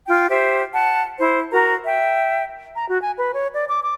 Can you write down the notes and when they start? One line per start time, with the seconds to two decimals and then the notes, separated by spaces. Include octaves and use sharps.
0.06 F4 G5
0.29 G4 C5 E5
0.72 F#5 A5
1.18 E4 C5
1.52 F#4 A#4 A#5
1.85 E5 G5
2.76 A#5
2.89 F#4
3.02 G#5
3.18 B4
3.34 C#5
3.54 D5
3.69 D6
3.83 D6